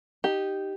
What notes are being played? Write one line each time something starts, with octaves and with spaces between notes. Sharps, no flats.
D#4 G4